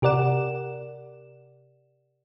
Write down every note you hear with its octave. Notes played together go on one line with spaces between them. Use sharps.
C3 G4 A#4 D5 F#5 E7